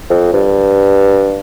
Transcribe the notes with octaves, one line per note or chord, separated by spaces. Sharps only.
F2
G2